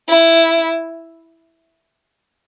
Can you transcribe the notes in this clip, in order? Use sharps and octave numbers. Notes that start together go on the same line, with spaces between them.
E4